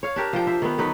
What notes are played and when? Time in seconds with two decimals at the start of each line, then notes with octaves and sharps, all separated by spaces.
0.03 C#5 F5
0.16 D4 G4 A#4
0.33 F3 G5
0.47 C5 E5
0.62 D#3 B3
0.78 D3 F#3 D#4 B4